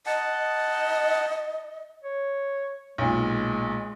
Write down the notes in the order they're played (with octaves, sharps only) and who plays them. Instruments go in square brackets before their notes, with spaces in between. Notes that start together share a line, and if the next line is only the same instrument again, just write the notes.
[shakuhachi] D#5 [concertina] F#5 A5
[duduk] C#5
[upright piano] B1 A#2 [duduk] G#3